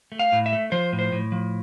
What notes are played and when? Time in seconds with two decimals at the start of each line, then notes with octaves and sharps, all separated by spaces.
0.12 A3
0.19 F5
0.32 A2
0.46 E5
0.53 A3
0.72 F3 C5
0.93 A2
0.99 C5
1.12 A2
1.32 F3